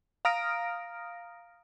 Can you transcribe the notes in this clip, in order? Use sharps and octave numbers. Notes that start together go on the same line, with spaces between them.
F5 A#5 D#6 F6 A#6 D7